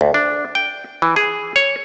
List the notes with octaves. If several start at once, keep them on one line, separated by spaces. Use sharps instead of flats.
D2
D4
G5
E3
G#4
C#5